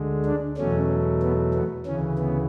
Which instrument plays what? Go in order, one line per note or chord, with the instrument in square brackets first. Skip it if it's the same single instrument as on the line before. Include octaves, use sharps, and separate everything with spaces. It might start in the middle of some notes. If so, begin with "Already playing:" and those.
Already playing: [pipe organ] D2 D3 G#3
D4
E2 B2 F#3 A3 C#4
B3
B3
D2 C#3 E3 C#4
B3